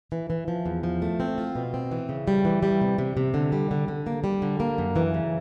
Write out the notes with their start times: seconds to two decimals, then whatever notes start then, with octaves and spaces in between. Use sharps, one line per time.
0.12 E3
0.30 E3
0.48 F3
0.66 E2
0.83 F3
1.02 A3
1.20 C4
1.38 F4
1.55 B2
1.74 C4
1.91 E3
2.09 C#3
2.28 G3
2.45 E3
2.63 G3
2.81 C3
2.98 C3
3.17 C3
3.34 D3
3.52 G3
3.71 D3
3.88 D3
4.07 A#3
4.24 G3
4.42 D3
4.60 A#3
4.78 F#2
4.96 E3
5.14 C#3